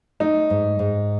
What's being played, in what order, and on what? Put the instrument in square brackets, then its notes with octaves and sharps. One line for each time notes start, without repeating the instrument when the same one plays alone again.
[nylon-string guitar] A3 [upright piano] D#4
[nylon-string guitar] G#2
G#2